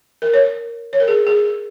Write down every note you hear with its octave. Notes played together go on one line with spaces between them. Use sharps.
A#4
C#5
C#5
A#4
G#4
G#4